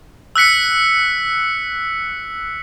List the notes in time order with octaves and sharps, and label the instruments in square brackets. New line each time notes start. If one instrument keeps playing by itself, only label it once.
[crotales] E6 F#6 B6 C#7